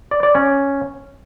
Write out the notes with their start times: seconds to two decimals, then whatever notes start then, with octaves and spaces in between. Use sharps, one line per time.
0.11 D5
0.23 D5
0.35 C#4